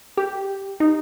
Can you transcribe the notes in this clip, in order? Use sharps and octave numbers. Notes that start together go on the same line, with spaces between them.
G4
D#4